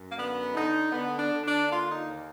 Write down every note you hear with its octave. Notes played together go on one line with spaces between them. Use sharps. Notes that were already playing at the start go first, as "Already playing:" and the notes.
Already playing: F#2
A#3
D3 B3
D3 D#4
D3 B3
D4
D3
D4
A#3 F4
D#4
D#2